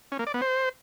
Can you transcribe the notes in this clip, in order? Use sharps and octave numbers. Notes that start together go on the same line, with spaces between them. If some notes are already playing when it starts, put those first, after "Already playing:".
C#4
A#3
D5
B3
C5